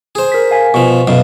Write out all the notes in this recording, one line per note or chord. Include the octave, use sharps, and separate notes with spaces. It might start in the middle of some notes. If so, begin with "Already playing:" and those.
G#4 C5
A#4 B6
F5 G#5 B6
B2 F3 C#6
B1 F#2 B2 F5